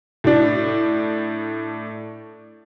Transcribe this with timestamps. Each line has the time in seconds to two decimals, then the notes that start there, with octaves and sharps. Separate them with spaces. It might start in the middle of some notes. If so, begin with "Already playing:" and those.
0.24 A2 D4